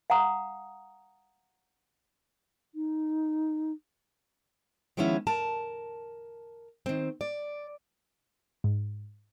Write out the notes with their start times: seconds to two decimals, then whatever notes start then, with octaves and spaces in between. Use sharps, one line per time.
0.10 F5 F#5 A#5 D#6
2.75 D#4
4.97 D#3 F3 G#3 B3 C#4 E4
5.27 A#4 A5
6.86 D#3 C4
7.21 D5
8.64 G#2